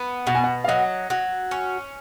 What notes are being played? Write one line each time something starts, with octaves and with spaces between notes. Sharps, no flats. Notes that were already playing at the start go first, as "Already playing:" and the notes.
Already playing: B3
B2 F#5
G#5
F#5
F5
F#3 D#5
F#3
C#4